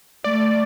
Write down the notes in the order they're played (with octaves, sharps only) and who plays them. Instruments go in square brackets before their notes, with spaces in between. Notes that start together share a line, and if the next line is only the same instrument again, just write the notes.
[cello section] A3 [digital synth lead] D5